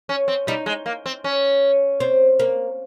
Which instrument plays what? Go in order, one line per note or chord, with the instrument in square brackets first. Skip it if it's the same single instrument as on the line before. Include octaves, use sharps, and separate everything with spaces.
[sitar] C#4
C4
[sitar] G3 [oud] D#4
[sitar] G#3
A#3
C4
C#4
[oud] C4
A#3